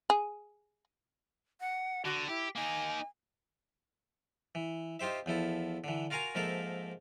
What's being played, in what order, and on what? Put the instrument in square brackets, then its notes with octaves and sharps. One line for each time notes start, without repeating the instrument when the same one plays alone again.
[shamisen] G#4
[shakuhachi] F#5
[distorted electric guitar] D3 [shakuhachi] F#4
[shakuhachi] E4 [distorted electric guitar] G4
[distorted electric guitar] A#3 D#4 [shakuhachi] G#5
[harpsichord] E3
D#4 F4 G4 C5 E5
E2 F3 E4 A4
D3 E3
F4 F#4 A#4 F5 G#5 A#5
G#2 F3 A#3 A4 A#4 E5